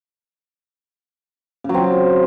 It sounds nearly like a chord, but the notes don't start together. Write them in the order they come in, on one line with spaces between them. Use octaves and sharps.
C#3 F#3 C4